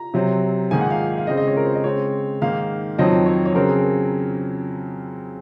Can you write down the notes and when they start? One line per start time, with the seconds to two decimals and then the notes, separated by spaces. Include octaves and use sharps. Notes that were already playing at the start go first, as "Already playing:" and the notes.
Already playing: A#5
0.14 C3 F#3 C4
0.71 G#2 D#3 A#3 G#5
0.81 F#5
0.90 F5
1.18 F5
1.27 C#3 G#3 C4 D#5
1.37 D#5
1.47 C#5
1.57 A#4
1.65 C5
1.75 D#5
1.84 C#3 G#3 C4 C#5
2.42 G#2 D#3 A#3 F5
2.98 F2 D#3 F#3 C4 D#5
3.26 C#5
3.46 C#5
3.55 C#3 F#3 C4 A#4
3.69 G#4
3.83 A#4